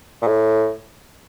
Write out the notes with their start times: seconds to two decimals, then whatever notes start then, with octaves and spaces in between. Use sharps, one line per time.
0.22 A#2
0.27 A2